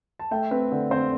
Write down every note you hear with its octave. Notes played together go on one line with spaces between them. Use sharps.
A5
A3 E5 G5
C4 B4
D3
C4 C5